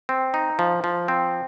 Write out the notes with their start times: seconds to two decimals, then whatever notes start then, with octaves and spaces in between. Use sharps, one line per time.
0.09 C4
0.34 D#4
0.59 F3
0.84 F3
1.08 C4